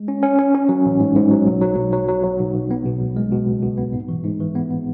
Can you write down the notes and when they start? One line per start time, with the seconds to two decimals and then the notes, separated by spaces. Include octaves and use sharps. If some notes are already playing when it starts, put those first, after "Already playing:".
Already playing: G#3
0.08 C#4
0.23 C#4
0.39 C#4
0.55 C#4
0.69 F#3
0.86 A1
1.00 G#2
1.15 G#2
1.31 F#3
1.47 B1
1.61 F#3
1.77 B1
1.92 F#3
2.08 F#3
2.23 F#3
2.39 B1
2.55 B1
2.71 B3
2.86 B2
3.01 C#2
3.16 G#3
3.32 B2
3.48 C#2
3.63 B2
3.78 B3
3.93 G#2
4.09 E3
4.24 G#2
4.40 E3
4.55 B3
4.71 B3